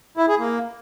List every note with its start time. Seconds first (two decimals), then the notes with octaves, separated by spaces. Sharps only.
0.17 E4
0.28 G#4
0.39 A#3